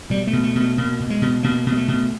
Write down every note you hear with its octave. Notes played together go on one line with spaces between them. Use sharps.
B2 G3
A3
B2
A3
B2 A3
B2 A#3
B2
G#3
B2
B2 A#3
B2
G#3
A3
B2